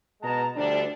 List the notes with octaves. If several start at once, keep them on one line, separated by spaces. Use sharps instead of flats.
B2 G#3 A5 A#5
D2 F3 G3 D4